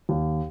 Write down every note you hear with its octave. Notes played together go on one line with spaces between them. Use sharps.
D#2